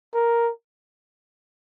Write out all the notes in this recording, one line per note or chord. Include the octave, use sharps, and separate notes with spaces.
A#4